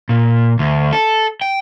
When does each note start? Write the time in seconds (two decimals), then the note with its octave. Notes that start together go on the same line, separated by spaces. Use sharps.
0.09 A#2
0.59 D2
0.93 A4
1.42 G5